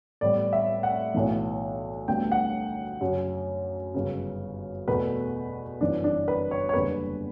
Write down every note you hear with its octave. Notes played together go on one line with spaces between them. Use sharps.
A1 A2 G3 B3 D5
E5
F#5
B1 A2 E3
D2 D3 G3 B3 G5
F#5
F#2 C#3 F#3
G1 F#2 C#3
E2 B2 A3 B4
G1 F#2 E3 D4
D4
B4
C#5
C#5
F#1 E2 D3 G3 B4